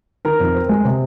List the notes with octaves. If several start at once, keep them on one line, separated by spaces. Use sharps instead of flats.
D#3 A#4 A#5
F2
C4
G#3
C3